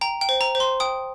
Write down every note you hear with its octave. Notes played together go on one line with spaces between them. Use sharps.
G5 A#5
G5
C5
A#5
C5
C6
G5 D#6